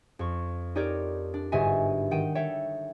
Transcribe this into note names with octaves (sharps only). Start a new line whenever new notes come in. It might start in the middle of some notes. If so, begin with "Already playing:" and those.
F2 C#6
D#4 G4 A#4 C#5 D5
D4
G1 G#2 F#4 D#5 E5 G#5
D#3 F#5 G5 D#7
A4 C#5 E5 G5